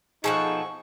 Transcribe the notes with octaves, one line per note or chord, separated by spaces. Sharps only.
B2 F3 D#4 G#4 A4 F#5 C#6